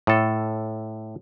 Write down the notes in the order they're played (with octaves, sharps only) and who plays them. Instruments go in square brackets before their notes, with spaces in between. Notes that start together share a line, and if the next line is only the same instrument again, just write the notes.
[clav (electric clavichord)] A2 A4